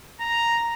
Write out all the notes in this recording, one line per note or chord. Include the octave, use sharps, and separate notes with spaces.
A#5